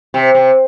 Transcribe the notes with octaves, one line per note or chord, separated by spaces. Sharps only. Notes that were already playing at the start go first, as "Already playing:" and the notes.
C3
C3